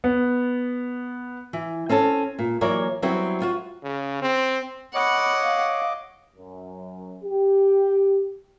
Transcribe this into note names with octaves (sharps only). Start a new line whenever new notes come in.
B3
E3
C4 C#4 A4 A5
A#2
E3 F#3 A#3 A#4 C#5 D5
F#3 G3 B3 C4 E4
F4 F#4
C#3
C4
C#5 D#5 F#5 B5 D6
F5
F#2
G4